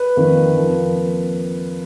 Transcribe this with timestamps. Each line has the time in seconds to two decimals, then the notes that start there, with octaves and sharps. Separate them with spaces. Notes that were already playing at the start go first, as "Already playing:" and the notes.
Already playing: B4
0.16 F2 D#3 A#3
0.55 F2 F3 A#3